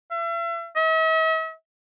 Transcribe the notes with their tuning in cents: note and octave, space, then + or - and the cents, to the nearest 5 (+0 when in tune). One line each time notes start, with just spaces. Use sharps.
E5 +40
E5 -45